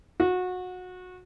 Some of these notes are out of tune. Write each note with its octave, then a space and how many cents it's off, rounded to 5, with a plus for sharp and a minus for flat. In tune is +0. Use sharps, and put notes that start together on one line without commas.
F#4 -25